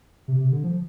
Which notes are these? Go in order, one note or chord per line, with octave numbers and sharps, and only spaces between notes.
C3
C3
D3
F3